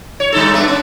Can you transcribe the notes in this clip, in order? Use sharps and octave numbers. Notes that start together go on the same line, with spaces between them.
C#5
G3 D#4 A4
A3 B3 D4
C#4